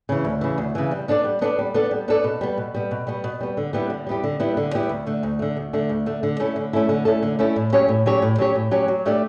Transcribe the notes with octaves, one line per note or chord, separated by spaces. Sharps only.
C#3 E3
D2
C#3 E3
D2
C#3 E3
G3
B3 D4 A4 D5
G3
B3 D4 A4 D5
G3
B3 D4 A4 D5
G3
B3 D4 A4 D5
B2
G3 B3
B2
G3 B3
B2
G3 B3
B2
G3 B3
D3
G3 B3 E4 G4
D3
G3 B3 E4 G4
D3
G3 B3 E4 G4
D3
G3 B3 E4 G4
D2
D3 A3
D2
D3 A3
D2
D3 A3
D2
D3 A3
D3
A3 C#4 E4 A4
D3
A3 C#4 E4 A4
D3
A3 C#4 E4 A4
D3
A3 C#4 E4 A4
A2
F#3 C#4 G4 C#5
A2
F#3 C#4 G4 C#5
A2
F#3 C#4 G4 C#5
A2
F#3 C#4 G4 C#5
F#3
A3 D4 G4 D5